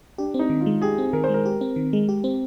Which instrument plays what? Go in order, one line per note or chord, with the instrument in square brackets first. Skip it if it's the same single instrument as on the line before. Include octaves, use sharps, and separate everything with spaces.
[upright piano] D4 [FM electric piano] G4
[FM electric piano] C4 [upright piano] D#4
[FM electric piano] D#3
[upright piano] F4
[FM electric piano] G#3
[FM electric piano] G4 [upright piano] G#4
[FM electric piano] C4
[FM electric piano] D#3 [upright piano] A#4
[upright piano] C5
[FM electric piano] G#3 [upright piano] A#4
[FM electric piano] G4
C4
D#3
G#3
G4
C4